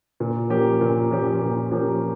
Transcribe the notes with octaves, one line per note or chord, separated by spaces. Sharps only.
A#2
F3 A#3 C#4 G4
A#2
F3 A#3 C#4 G4
A#2
F3 A#3 C#4 G4